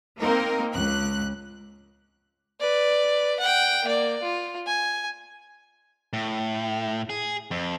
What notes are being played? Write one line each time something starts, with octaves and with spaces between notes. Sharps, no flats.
A#3 C4 D#4 A#4
C#2 F#6
B4 D5
F#5 G5
A#3 D5
F4
G#5
A2
G#4
F2